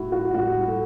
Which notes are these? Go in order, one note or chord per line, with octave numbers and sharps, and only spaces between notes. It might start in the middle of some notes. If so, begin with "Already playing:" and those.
Already playing: A2 G3 E4 F#4
F#4
A2 G3 F#4
A4